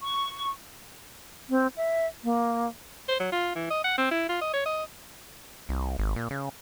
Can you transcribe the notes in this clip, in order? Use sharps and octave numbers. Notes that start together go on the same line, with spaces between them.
C#6
C4
E5
A#3
C5
F#3
F4
E3
D#5
F#5
C4
E4
F4
D#5
C#5
D#5
C2
G#1
A#2
C#3